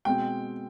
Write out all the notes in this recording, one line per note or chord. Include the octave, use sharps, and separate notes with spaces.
B2 G#3 C4 G5